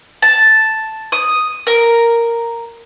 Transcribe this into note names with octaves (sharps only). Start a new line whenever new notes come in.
A5
D#6
A#4